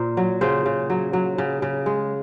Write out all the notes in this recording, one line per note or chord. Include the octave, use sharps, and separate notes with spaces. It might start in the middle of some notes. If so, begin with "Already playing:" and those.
Already playing: A#2 A#4 C5
F#3
C#3 C5
C#3
F#3
F#3
C#3
C#3
G#3